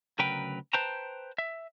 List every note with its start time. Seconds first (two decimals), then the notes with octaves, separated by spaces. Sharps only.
0.19 D2 C#3 F#3 A#4 B4 G5
0.73 B4 C5 G5 A5 A#5
1.38 E5